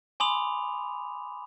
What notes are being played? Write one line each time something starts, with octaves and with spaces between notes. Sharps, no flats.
G#5 B5 C6 D6 D#6 F7